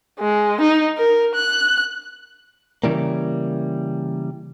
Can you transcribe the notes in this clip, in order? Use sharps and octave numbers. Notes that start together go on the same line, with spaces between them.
G#3
D#4
A#4
F#6
C#3 E3 G3 A#3